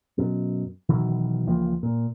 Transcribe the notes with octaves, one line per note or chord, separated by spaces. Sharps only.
F#2 B2
B2 D#3 E3 F#3
C#2 E3 F3 A#3
A#2